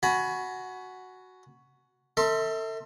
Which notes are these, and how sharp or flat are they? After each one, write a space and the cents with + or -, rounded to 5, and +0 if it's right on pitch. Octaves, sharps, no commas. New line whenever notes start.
F#4 +0 G#5 +30 B5 +0
A4 +40 E5 -30 C6 +0